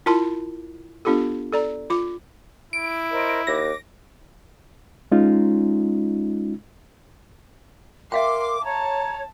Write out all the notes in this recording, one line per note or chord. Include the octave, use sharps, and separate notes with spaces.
E4 F4 A#4 A5 C6
B3 D4 F4 G4 A4
A4 D5 A#5
F4 D6
E4 D7
A#4 C5 D#5
D#2 D6 A#6
G#3 C#4 D#4 F4
A#4 E5 F5 G5 C6 D6
C#5 A5 A#5